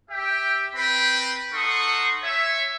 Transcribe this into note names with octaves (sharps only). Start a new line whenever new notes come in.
G4 E5 G5
C4 B4 G5 B5
D#4 A4 F#5 C6 C#6 D#6
C#5 E5